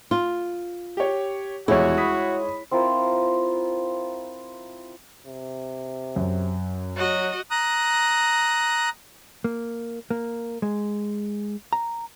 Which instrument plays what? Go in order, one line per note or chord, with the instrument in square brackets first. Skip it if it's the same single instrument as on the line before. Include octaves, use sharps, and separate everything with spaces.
[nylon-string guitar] F4
[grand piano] G4 C#5
[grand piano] D#1 E2 [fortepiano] G#3 C#5 [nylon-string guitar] E4 [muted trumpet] F#4
[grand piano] B5 D#6 B6
[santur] C4 E4 F4 A#4
[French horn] C3
[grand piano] F#2
[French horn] F#3 [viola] F#4 D#5
[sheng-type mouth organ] A#5 D#6 F#6
[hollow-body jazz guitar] A#3
A#3
G#3
A#5